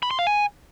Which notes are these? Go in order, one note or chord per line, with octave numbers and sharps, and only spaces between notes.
B5
C6
F5
G#5